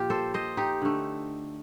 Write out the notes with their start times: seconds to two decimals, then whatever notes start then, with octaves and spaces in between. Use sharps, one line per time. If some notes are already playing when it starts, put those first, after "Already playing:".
Already playing: A#2 F3 A#3 F4 G4
0.10 A4 C5
0.34 C5 D#5
0.57 D#4 G4
0.82 D3 A3